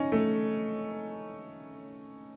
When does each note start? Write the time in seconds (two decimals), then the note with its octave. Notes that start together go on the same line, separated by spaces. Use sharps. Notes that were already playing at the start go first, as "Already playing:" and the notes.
Already playing: C#4 D#4
0.12 A3